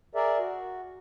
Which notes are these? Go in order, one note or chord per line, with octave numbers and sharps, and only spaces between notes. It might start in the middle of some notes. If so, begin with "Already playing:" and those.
G#4 A#4 D5 E5
F#4